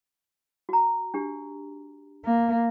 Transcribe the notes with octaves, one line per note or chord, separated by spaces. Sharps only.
F#4 A#5
D4 G4
A#3